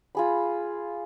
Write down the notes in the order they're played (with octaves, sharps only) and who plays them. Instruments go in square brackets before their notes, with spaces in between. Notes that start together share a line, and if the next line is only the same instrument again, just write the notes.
[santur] F4 G#4 B5